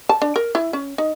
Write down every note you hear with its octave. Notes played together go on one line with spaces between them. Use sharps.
A5
D4
A#4
E4
C#4
D#4